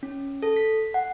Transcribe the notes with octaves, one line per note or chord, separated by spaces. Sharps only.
C#4
A4
B6
F#5